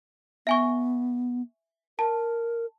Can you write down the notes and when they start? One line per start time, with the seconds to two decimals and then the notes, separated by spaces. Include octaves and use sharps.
0.47 B3 E5 G#5 C#6
1.99 A#4 A5